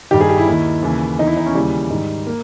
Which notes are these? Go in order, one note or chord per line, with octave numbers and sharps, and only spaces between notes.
G2 D#3 G4
G#4
G4
E4
D#2 D#3
D#2 C#3 E3
E2 D#3 D#4 E4
D#4
C#4
D#2 C#3 E3 G3
G#2 D#3
A#3